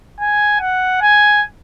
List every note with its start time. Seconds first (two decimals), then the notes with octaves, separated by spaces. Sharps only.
0.20 G#5
0.60 F#5
1.01 G#5